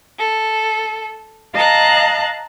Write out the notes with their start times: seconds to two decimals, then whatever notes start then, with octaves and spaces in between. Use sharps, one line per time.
0.18 A4
1.54 D#5 F5 A5 A#5 F#6